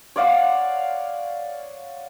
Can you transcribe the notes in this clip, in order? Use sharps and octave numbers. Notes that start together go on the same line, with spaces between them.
C#5 D5 F5 F#5